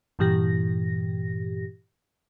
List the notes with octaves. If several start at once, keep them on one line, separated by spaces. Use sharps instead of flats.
G2 A#2 E3 G4 A#6